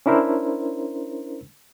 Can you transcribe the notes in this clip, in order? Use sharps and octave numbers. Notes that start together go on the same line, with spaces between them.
C#4 D4 E4 A#4 C5